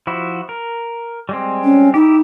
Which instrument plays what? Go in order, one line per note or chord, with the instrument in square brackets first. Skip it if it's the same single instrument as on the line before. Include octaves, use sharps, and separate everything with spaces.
[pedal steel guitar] F3 E4 F#4
A#4
G3 G#3 C4
[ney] C#4
[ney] D#4 [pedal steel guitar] E4 G4